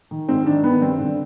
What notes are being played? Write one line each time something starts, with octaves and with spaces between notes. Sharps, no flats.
D#3
G#2 C4
D#3 D4
D#3 B3
G2 C4
D3